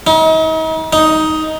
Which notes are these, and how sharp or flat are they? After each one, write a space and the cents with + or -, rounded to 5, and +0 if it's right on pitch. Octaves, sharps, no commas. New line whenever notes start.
D#4 +40
D#4 +10